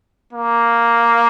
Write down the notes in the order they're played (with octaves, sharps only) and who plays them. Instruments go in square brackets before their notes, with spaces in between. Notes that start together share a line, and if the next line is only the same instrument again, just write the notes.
[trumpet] A#3